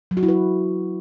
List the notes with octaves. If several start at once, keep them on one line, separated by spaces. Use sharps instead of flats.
F#3
F#4
E4
B4